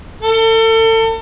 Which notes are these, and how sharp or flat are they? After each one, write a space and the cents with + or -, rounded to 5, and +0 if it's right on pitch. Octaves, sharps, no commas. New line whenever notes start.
A4 +35